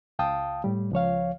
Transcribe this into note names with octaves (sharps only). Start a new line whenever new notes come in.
C#2 F5 G5 A5 D#6
A2 G3
C#2 F3 C#5 F5